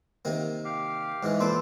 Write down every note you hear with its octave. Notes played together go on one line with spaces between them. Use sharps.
C3 D#3 A#3
G4 F5
G#2 E3 G#3
A#2 A4 B4 C5 D6